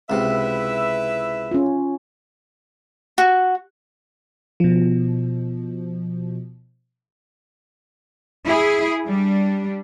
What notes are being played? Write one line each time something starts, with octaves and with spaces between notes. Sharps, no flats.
C#2 C3 E4 B4 E5
C#4 F4
F#4
B2 F3
E4 G#4
G3 D4